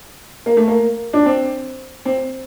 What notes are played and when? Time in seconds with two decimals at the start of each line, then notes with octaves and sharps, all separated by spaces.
0.46 A#3
0.57 A3
0.68 A#3
1.13 D4
1.26 C4
2.05 C4